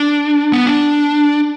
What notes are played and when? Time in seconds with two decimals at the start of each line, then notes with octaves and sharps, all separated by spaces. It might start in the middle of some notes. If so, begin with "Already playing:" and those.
Already playing: D4
0.53 B3
0.66 D4